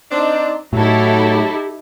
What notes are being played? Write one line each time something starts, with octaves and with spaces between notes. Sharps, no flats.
C4 D4 D#4
A2 F#3 D#4 E4 G4 A4